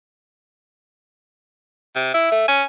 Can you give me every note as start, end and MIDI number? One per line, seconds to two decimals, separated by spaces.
1.96 2.13 48
2.14 2.29 64
2.14 2.46 76
2.32 2.44 57
2.48 2.63 61
2.48 2.65 80